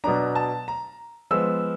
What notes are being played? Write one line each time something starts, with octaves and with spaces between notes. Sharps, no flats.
B2 F#3 B3 D4 A#5
A5
A#5
F3 G#3 B3 E6